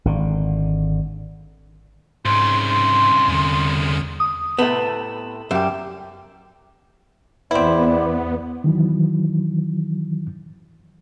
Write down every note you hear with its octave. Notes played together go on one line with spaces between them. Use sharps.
G#1 D3
C2 G#2 C#3 C6
C6
E2 D3
D#6
A2 C3 A3 B3 E7
F#2 G3 G4 E5
E2 B3 C4 E4 D5
D#3 E3 F#3